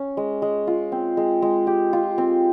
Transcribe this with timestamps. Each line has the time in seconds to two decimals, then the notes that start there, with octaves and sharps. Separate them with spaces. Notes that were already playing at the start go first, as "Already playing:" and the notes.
Already playing: C#4
0.17 G#3
0.42 G#3
0.67 F4
0.92 C4
1.17 G#3
1.42 G#3
1.67 G4
1.93 F4
2.18 C4